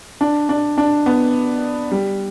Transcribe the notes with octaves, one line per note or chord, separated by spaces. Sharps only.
D4
D4
D4
B3
G3